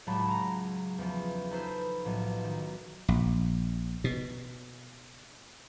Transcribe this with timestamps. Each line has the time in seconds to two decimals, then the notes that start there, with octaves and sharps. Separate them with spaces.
0.07 C#2 A2 F#3 D4 A5 B5
0.25 A#5 C#6 A#6
0.98 E2 F3
1.51 C#4 D#4 A4 B4 C5
2.04 B1 A2 F3
2.44 D#3
3.08 A#1
4.04 B2